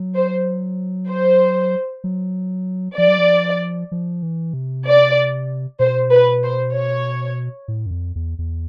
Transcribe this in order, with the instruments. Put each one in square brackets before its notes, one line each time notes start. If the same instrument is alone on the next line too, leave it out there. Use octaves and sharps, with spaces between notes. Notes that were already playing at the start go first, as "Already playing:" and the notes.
Already playing: [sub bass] F#3
[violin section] C5
C5
[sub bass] F#3
[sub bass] F3 [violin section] D5
[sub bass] F#3
F3
F3
E3
C3
[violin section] D5
[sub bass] B2 [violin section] C5
[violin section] B4
C5
C#5
[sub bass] A2
F#2
F2
E2
E2